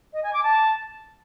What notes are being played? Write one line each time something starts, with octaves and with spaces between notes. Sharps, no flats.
D#5
G#5
D6
A5